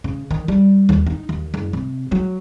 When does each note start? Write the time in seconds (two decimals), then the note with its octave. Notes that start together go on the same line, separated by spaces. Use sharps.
0.04 C#3
0.31 D#3
0.48 G3
0.89 D#2
1.07 D#4
1.29 D#2
1.54 F#1
1.73 C3
2.12 F#3